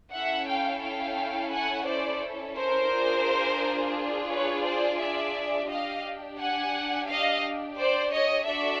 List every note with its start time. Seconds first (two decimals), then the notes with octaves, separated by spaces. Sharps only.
0.13 C#4 E4 A4 E5 F#5
0.48 F5 G5
0.83 F5 G5
1.52 F#5 G#5
1.87 C5 D5
2.57 A#4 C5
2.92 D4 F4 G#4
4.31 B4 C#5
4.65 C5 D5
5.01 D5 E5
5.70 D4 G4 D#5 F5
6.39 F#5 G#5
7.09 D#5 F5
7.78 C5 D5
8.14 C#5 D#5
8.48 D4 F#4 A4 D5 E5